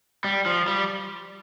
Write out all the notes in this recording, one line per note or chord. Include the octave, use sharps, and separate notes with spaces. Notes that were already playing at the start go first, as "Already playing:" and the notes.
G3
F3
G3